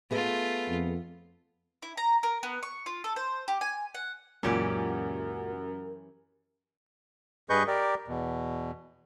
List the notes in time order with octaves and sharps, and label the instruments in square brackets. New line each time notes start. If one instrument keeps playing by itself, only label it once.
[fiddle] A3 F4 [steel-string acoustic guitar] B3 G#4 D#5
[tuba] F2
[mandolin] E4
A#5
A#4
B3
C#6
F4
A4
C5
G4
G#5
F#5
[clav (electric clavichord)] C#2 A#2 [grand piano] F#2 [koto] E3 C#4 G4 [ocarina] A#4
[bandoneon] G2 G#4 B4 D#5 C#6 G6
G4 A#4 D5
E2 B2